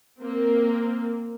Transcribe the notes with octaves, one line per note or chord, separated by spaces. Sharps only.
A#3 C4